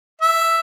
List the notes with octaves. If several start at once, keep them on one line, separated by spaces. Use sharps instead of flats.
E5